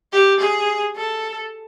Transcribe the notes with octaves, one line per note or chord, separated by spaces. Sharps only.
G4
G#4
A4